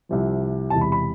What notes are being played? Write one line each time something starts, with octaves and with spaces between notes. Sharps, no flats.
C2 C3 F3
E1 E2 C3 A5
B5
B5